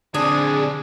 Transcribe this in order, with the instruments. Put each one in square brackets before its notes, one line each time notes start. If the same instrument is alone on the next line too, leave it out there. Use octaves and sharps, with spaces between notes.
[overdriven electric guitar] D3 C4 [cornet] D4 [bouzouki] G#4